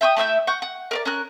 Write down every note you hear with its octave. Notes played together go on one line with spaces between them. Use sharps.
E5 G5 C#6 D#6
A3 E4 E5 G6
F#5 C#6 G6
F#5
A#4 B4 D5
C#4 A#4 F#6